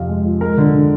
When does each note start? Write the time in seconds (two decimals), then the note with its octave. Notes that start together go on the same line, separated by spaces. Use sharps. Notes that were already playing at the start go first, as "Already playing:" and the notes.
Already playing: F2 C3 F5
0.09 G#3
0.25 F3
0.41 G#3 A#4
0.58 D3
0.74 D3